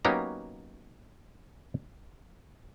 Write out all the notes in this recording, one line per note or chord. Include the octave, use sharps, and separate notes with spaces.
F#3 A#3 B3 C#4 D#4 G4